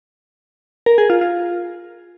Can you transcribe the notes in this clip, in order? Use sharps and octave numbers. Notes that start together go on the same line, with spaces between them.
A#4
G#4
F4
F4